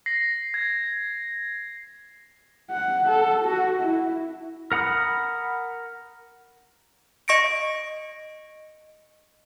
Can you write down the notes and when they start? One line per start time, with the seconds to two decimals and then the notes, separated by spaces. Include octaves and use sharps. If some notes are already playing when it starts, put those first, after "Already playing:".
0.06 A#6 C7
0.54 G#6
2.71 F#5
3.09 A4
3.45 F#4
3.81 E4
4.72 A#4 F#5 B5 D#6
7.28 D#5 C#6 A#6 C#7 D7